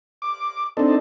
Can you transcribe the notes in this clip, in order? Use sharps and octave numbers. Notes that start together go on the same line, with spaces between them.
D6
C4 D4 D#4 A4